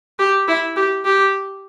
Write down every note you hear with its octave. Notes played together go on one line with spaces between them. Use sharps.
G4
E4
G4
G4